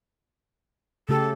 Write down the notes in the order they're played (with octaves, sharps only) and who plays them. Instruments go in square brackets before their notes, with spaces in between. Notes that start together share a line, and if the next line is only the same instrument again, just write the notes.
[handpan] C#3 A3 G4 [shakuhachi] A4